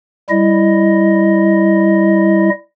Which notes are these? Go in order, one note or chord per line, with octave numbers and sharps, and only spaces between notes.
G3 E4 D#5